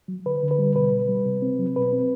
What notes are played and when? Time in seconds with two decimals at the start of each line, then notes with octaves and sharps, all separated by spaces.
0.08 F#3
0.26 D3 B4
0.43 D3
0.51 B4
0.59 G3
0.75 B2 B4
0.92 B2
1.08 G3
1.26 C3
1.42 C4
1.58 F#3
1.76 B2 B4
1.93 C4